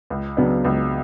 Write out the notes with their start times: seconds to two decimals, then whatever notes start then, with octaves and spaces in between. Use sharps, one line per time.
0.10 C#2
0.37 C#3 F#3 B3 D4
0.65 C#2